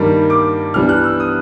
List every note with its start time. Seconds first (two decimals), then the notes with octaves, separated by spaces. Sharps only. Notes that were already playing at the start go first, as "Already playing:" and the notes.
Already playing: G2 D#3 G3 A#3
0.30 D6
0.74 G2 E3 G3 B3 D4 F6
0.89 F#6
1.04 E6
1.20 D#6